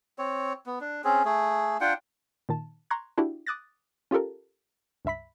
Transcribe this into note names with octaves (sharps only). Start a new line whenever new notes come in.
C4 C#5
B3
D4
C4 C#4 G#4
A3 G#4
D4 F4 F#5 G5
A#2 D#3 A5
A#5 C6 C#6 F#6 G#6
D4 E4 F#4 G4
D6 D#6 F#6 A6 A#6
C#4 F4 G4 A4 A#4
C#2 G2 E5 B5 B6